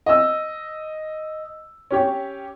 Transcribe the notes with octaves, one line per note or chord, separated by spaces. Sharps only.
D#5 E6
C#4 G4 C#5